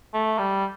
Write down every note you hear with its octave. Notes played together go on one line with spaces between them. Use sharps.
A3
G3